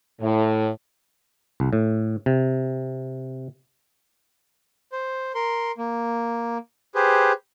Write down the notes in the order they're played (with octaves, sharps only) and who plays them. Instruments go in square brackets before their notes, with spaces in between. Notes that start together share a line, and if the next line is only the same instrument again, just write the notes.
[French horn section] A2
[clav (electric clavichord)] C2
A2
C3
[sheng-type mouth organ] C5
A#4 C6
A#3
G4 G#4 B4 C5